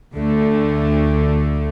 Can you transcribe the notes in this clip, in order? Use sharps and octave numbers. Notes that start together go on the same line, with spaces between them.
D2 D3 A3